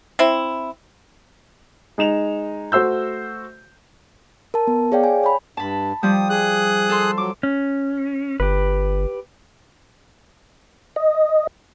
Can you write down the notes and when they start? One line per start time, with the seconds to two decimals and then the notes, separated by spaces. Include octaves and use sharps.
0.19 C4 E4
1.98 G#3 D#4 E7 F7
2.72 A3 F#4 C5 E6 G6
4.54 A#4 A5
4.67 B3
4.92 G#4 C#5 D5 F5 G5
5.04 G#5
5.23 C#5 G#5 B5
5.57 G2 A5 B5
6.03 F3 G3 D#6
6.30 G#4 D#6 F#6
6.89 A4 C6
7.18 F#3 D6
7.43 C#4
8.40 G1 G4 B4
10.96 D#5